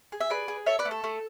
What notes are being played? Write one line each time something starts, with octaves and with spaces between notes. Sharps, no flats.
G#4
E5
G#4 B4 D5
G#4
A4 C#5 E5
B4 D5
A3
A4
A3